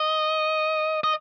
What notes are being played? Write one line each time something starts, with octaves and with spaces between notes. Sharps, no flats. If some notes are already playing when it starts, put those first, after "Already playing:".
Already playing: D#5
D#5